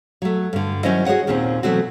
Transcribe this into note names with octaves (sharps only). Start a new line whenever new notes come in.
F#3 A3
G2 D3
D#3 F#3 C#4 E4 C5 D#5
F#4 G#4 C5 C#5 F#5
D#2 A#2 D#3 C4 C#4
B2 E3 F#3 A3 C4 F#4